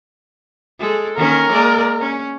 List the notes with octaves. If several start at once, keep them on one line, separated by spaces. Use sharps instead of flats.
G#3 A4
D#3 A#3 C#4 A#4
G#3 A#3 D5
C#4